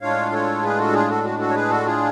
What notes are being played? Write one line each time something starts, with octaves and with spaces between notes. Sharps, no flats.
A2 G#3 D4 F4 C#5 F5
A4 C#5
G#4 B4
F#4 A4
F4 G#4
F#4 A4
F#4
F#4 A4
C#5
G#4 B4
F#4 A4
F4 G#4